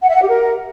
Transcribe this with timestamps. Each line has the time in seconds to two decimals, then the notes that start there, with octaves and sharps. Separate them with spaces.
0.02 F#5
0.08 E5
0.15 F#5
0.22 G4
0.28 A#4